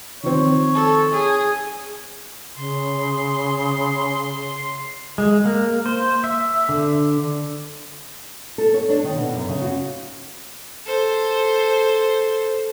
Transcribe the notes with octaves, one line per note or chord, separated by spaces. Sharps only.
D#3 F3 C4 C#5
A4
G#4
C#3 C6
G#3
A#3
C5
E5
D3
A4
C#5
D4
D#3
B2
F#2
C#3
F#4
A4 C5